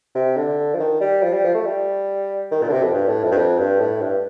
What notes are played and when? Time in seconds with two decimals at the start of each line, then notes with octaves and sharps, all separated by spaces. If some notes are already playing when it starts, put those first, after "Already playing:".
0.15 C3
0.37 D3
0.74 F3
0.80 D#3
1.01 G3
1.23 F3
1.33 G3
1.44 F3
1.54 A3
1.66 G3
2.51 D#3
2.62 A#2
2.68 D3
2.72 C3
2.83 F2
2.93 G2
3.08 A2
3.23 F2
3.31 G2
3.37 F2
3.59 G2
3.80 A2
4.02 G2